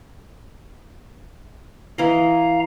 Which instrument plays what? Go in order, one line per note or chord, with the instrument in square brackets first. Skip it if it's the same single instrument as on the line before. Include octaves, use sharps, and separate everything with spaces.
[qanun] E3 D#5 [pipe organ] F5 A#5